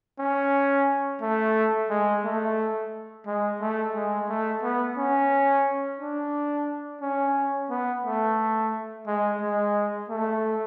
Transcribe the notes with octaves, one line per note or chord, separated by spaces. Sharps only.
C#4
A3
G#3
A3
G#3
A3
G#3
A3
B3
C#4
D4
C#4
B3
A3
G#3
G#3
A3